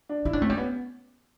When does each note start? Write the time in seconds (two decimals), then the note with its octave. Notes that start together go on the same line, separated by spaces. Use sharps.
0.09 D4
0.25 D#4 E4
0.33 C#4 D4
0.42 A3 C4
0.49 G3 C#4
0.58 B3